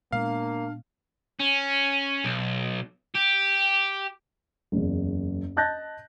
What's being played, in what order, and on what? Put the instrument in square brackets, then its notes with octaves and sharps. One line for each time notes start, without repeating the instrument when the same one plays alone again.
[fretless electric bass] A#2 G#3 B3 [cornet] A#3 [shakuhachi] D4 [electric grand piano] F5
[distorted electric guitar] C#4
B1
G4
[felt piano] F#1 E2
D#5 A5 F#6 G6 A6 A#6